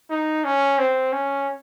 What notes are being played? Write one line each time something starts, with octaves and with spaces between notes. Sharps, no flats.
D#4
C#4
C4
C#4